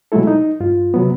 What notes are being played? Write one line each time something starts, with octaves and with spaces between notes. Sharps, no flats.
B2 F#3 G#3 A3 E4 A4
D#4
G2 F4
C3 F#3 B3